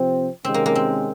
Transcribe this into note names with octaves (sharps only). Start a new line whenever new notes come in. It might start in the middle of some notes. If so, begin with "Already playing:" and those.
Already playing: C3 F3 C4
C3 D#3 G#3 C4 C#4
A#3
A#3
C4